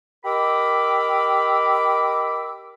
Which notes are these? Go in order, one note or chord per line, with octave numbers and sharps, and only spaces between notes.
G4 A#4 D#5 B5 D6 E6